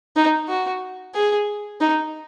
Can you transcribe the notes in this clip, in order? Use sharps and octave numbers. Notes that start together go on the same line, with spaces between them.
D#4
F#4
G#4
D#4